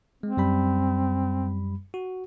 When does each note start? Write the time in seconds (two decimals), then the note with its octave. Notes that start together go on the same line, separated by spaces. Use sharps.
0.23 G#3 C4
0.37 F#2 G3 B5
1.94 F#4